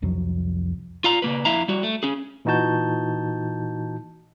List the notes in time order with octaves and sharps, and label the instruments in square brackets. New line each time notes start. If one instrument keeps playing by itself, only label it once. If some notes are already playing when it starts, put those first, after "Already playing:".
[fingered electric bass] C2 F2 F#3
[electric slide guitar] F4 F5 A#5
C#3 A#3 B4
F2 E4 E5 F5 A#5
G3 F#4
A3
C#4 G#4
[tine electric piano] A#2 E3 D#4 F#4 A5 G6